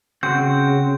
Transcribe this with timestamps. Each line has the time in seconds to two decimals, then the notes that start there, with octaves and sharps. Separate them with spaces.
0.23 C#3 C4 F#4 G6